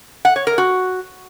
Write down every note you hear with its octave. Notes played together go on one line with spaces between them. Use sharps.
F#5
C#5
A#4
F#4